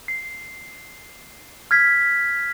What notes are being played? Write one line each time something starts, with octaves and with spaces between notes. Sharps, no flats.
C7
F6 G#6 B6